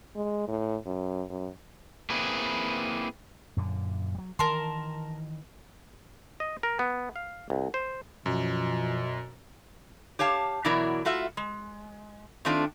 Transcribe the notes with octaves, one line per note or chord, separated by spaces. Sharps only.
G#3
A2
F#2
F#2
A#3 C4 E4 G#4 B4
F#2 A#2 D3
F#3 G3
D#3 E3 A#4 A5 C6
D#5
A#4
B3
F5
C2
C5
F#2 B2 F3
G4 C#5 F5 A5
B2 E3 F#3 E4 A#4 D5
A3 F4 F#4 E5
G#3
D#3 A3 C4 D4 F4